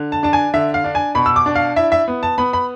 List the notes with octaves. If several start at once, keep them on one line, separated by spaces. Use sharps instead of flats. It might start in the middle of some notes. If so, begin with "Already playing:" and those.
Already playing: D3
A5
D4 A5
G#5
D3 E5
F5
D4
G#5
B2 B5
E6
D6
D4
F5
E4 E5
E5
B3
A5
B3 B5
B5